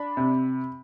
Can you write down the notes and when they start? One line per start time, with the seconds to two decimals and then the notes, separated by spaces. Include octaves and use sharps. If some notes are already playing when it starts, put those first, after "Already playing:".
Already playing: D4 B5
0.17 C3